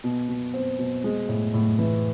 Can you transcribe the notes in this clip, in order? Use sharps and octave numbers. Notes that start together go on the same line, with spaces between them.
B2
B2
C4
B2
G#3
A2
A2
E3